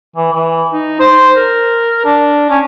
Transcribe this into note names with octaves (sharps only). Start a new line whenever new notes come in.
E3
E3
D#4
C5
A#4
D4
C#4